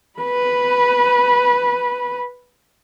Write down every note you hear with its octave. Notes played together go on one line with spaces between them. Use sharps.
B4 B5